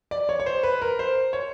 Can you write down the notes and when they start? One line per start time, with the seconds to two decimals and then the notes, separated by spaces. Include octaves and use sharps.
0.11 D5
0.29 C#5
0.40 C#5
0.46 C5
0.63 B4
0.82 A#4
0.99 C5
1.33 C#5